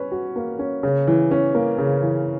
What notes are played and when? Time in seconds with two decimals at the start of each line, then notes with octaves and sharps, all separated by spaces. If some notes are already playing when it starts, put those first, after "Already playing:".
Already playing: C#4 B4
0.12 F#4
0.36 A#3
0.59 C#4
0.83 C#3
1.07 E3
1.31 C#4
1.55 A#3
1.78 C#3
2.02 E3